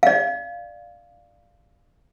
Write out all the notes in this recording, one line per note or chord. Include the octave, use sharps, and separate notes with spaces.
D5 F5